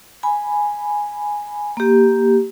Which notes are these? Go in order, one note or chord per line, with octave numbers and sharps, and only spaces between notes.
G#5 B5
A#3 G4